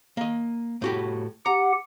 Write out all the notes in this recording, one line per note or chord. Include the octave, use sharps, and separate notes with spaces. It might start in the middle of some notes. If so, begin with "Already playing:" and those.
A#3 D#5
A2 F#4 G4
G4 F#5 A#5